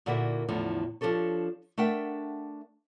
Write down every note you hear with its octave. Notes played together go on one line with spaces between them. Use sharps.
A#2 D3 A#3 E4 F#4 E5
E2 A2 D3 F3
F3 D4 G4 A4 C#5
A3 D4 A#4 E5 F#5 G5